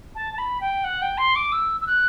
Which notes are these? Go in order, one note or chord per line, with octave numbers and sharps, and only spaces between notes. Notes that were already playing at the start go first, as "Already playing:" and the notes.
A5
A5
B5
G5
F#5
G5
C6
D6
E6
E6
F#6